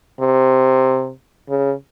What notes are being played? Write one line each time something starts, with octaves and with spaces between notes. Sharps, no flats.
C3
C#3